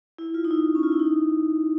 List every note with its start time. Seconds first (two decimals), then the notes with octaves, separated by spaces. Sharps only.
0.18 E4
0.34 F4
0.44 D#4
0.51 E4
0.75 C#4
0.83 F4
0.92 E4
1.00 D#4